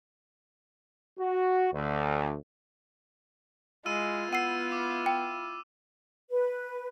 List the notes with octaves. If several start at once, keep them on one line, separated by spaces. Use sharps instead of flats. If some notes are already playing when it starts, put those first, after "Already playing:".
F#4
D2
G#3 E4 F4 E6 D#7
B3 F#5 E6 C7 D#7
D6
G5
B4